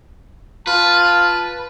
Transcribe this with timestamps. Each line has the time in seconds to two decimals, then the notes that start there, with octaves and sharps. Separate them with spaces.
0.67 F4 B4 A5